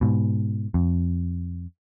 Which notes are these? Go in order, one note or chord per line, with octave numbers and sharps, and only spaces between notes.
G#2 B2
F2